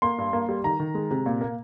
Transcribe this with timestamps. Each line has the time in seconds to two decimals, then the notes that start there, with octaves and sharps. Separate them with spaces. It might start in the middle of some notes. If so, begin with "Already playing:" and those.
0.02 A#3 C6
0.18 G2
0.33 A#3
0.49 G3
0.64 D#3 A#5
0.80 D#3
0.95 G#3
1.11 C3
1.26 A#2
1.41 A#3